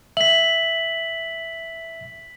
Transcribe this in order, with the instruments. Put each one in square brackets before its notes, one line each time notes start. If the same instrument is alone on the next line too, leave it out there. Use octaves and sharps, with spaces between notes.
[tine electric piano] E5 [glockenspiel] B6 F#7